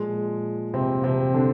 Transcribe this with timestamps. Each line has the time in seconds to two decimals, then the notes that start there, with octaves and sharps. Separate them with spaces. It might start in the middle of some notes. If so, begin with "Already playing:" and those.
Already playing: A#2 F3 G#3
0.74 C3 C4
1.04 C3 C4
1.34 D3 D4